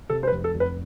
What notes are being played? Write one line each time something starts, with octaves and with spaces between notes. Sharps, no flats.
C3 A4
C5
B4
F1
A4
F1
B4